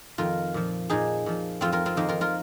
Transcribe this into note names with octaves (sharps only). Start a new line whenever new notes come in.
F2 D#3 F4 A#4
A#2 F3
A#2 F3 D#4 G#4
A#2 F3
F2 F3 C4 F4
F4 A#4
C4 F4
F2 D#3 A#3 D#4
F4 A#4
F4 A#4